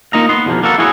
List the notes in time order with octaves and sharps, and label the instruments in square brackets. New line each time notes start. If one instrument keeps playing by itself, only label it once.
[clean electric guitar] A#3 D#4 F4 D#5 A#5
B3 C6
E2 B2 F3 A#3
A#3 B3 F#4 A4
E4 F#4 G#4 C#5